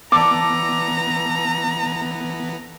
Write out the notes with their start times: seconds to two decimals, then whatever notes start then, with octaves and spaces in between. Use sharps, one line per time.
0.12 E3 B3 A4 D5 A5 A#5 D6